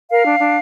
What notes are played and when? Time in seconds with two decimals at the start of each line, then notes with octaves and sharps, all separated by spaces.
0.10 A#4 F5
0.25 D4
0.40 D4